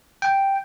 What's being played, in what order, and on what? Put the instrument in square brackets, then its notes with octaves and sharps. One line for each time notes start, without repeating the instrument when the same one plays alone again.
[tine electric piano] G5